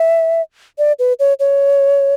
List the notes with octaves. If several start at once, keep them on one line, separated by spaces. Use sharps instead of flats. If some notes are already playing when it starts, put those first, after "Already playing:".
Already playing: E5
D5
B4
C#5
C#5